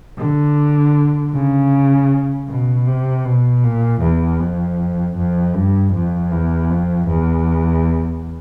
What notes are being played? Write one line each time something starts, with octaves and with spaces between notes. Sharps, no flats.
D3
C#3
B2
C3
B2
A#2
E2
F2
F2
G2
F2
E2
F2
E2